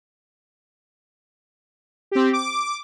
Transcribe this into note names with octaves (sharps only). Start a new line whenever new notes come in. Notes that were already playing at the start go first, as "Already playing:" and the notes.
C4 G4
D6